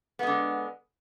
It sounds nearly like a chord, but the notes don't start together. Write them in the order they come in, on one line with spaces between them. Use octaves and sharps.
B3 G#3 D3